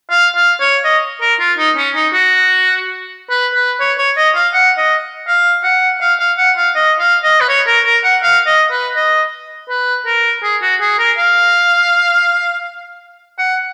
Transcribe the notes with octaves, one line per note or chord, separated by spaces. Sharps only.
F5
F5
C#5
D#5
A#4
F4
D#4
C#4
D#4
F#4
B4
B4
C#5
C#5
D#5
F5
F#5
D#5
F5
F#5
F5
F5
F#5
F5
D#5
F5
D#5
B4
C#5
A#4
A#4
F#5
F5
D#5
B4
D#5
B4
A#4
G#4
F#4
G#4
A#4
F5
F#5